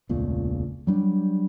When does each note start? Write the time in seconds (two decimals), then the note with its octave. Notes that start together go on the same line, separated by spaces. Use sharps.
0.09 E1 C#2 A#2 A3
0.87 F#3 G3 D4